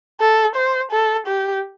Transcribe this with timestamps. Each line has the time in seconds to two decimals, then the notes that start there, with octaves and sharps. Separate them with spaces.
0.20 A4
0.56 C5
0.91 A4
1.27 G4